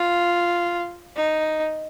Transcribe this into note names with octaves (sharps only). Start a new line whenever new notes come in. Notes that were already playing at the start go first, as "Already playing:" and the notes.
Already playing: F4
D#4